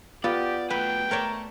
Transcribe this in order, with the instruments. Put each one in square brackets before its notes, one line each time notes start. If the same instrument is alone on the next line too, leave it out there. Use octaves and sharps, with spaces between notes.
[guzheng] B3 [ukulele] F4 [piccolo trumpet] G4 [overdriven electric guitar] D5
[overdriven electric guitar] F#3 A3 [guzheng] B4 [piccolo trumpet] G5
[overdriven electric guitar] A3 [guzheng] A#4 C#5 D5